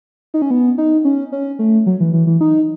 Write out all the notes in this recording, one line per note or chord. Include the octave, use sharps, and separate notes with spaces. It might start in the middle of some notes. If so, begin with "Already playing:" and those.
D#4
C#4
B3
D#4
C#4
C#4
A3
F#3
E3
E3
E3
D#4